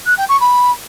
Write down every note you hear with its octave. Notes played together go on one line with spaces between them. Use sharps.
F#6
G5
C#6
B5